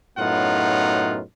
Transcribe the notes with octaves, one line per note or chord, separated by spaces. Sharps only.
F#2 A2 B3 D#4 F4 F#5